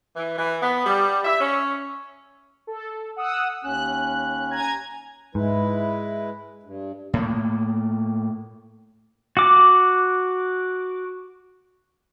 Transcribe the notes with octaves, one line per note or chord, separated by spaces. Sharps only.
E3
E3
B3
G3
E5
C#4
A4
F#5 D#6 E6
D#2 C#4 F#6
G#5 A#5 G#6
G#2 G#3 E4 B4
G2
A2 A#3
F#4 D6